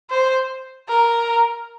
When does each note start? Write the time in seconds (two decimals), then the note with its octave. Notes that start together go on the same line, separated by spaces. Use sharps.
0.11 C5
0.89 A#4